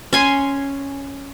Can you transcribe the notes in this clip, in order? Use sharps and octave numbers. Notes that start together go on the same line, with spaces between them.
C#4 G#5 C6